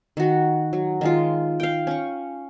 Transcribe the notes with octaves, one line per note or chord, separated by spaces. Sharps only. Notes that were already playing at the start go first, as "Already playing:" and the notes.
D#3 F#4
F#3
D#3 G#3 F4
F5 G5
C#4 C#6